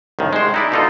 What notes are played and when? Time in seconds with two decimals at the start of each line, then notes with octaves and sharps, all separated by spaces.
0.19 C2 A2 D#3
0.33 G#3 C5
0.54 D#4 E4 D5
0.72 B2 D3 D#4 F4 A4